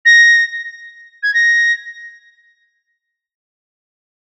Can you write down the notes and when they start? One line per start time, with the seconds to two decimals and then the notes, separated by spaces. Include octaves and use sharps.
0.05 A#6
1.23 G#6
1.34 A#6